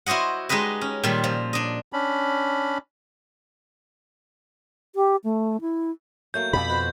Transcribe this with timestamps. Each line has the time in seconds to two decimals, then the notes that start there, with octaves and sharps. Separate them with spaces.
0.06 E4 F#4 C5 D#5 F#5
0.49 G#3 D#4 G4 B4 D#5
0.81 C#4
1.04 A#2 D#3 G3
1.24 F3
1.53 D4 D#5
1.93 C#4 D4 B5
4.96 G4
5.24 A3
5.61 E4
6.34 F#3 A3 A#3 G6
6.53 F2 B2 G3 D5 B5
6.70 F#4 C5